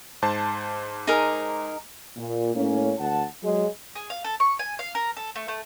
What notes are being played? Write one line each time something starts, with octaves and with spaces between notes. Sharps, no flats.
G#2 C5 A5
D#4 G#4 A#4
A#2
A2 A#3 C#4
D2 F#5 A5
F#3 G#3
G#4
F5
A4
C#6
G#5
F5
A#4
A4
A3
A3